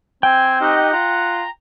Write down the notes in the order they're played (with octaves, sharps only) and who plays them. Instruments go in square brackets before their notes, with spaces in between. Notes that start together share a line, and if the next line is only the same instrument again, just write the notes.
[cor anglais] C4 [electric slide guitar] G5 [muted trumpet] G#5
[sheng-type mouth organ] D#4 G4 D#5 [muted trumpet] F#5
[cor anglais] F4 [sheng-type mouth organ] A#5